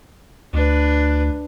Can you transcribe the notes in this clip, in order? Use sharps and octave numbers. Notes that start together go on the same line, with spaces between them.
D2 D4 B4